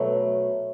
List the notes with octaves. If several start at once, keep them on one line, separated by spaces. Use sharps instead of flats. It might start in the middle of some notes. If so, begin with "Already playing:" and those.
Already playing: B2 F#3 A3